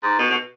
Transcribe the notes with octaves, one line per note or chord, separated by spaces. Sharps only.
G#2
B2
B2